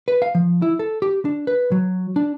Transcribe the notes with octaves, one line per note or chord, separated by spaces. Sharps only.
B4
F5
F3
E4
A4
G4
D4
B4
F#3
D4